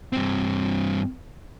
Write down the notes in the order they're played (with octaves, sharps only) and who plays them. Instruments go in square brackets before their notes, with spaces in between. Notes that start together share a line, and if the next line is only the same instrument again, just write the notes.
[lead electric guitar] G2 C4